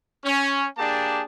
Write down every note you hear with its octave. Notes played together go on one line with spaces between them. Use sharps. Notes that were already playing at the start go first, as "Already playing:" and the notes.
C#4
A#3 D4 G4 G#4 A5